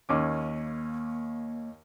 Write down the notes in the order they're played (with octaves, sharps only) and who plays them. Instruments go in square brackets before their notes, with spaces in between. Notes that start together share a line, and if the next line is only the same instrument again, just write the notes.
[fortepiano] D#2 C#4 D6 [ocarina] A#3